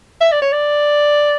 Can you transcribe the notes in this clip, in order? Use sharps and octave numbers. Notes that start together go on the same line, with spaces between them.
E5
D5
C#5
D5